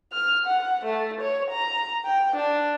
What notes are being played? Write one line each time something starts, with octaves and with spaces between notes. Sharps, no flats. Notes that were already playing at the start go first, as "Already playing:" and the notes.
F6
F#5
A3
C#5
A#5
G5
D4